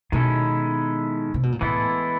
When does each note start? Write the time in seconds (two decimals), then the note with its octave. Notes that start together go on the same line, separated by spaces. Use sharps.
0.12 B2 D#3 G#3 C#4 E4 A4
1.34 C3
1.43 B2
1.52 A#2
1.61 A2 E3 G#3 B3 E4 A4